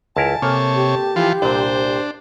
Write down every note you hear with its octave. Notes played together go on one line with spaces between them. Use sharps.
C#2 E4 A#4 G#5 A5
C3 A#3 A4 C#5
G4
E3 F3 F4
C2 A#2 D4 C5